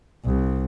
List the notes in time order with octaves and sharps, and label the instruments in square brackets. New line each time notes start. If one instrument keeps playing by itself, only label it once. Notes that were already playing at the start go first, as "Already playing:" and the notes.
[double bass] C2